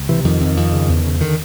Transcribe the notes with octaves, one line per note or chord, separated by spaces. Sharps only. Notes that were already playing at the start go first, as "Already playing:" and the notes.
Already playing: C#2
C3 E3
F2 D#3
F2
F2
C#3
E2
C#3
D3 D#3